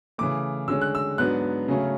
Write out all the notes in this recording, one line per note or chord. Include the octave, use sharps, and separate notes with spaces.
C#3 E3 A3 D6
D3 G#3 C#4 E6
F#6
E6
G#2 F#3 B3 D4 F#6
C#3 F#3 A3 C#4